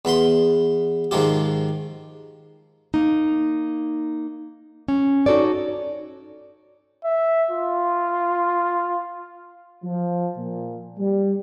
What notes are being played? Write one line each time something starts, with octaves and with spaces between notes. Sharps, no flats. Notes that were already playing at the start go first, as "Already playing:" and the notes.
E2 B3 B5 C6
G#2 D#3 F3 G4
A#3 D#4
C#4
D#4 F#4 A4 C#5 D5
E5
F4
F3
A#2
G3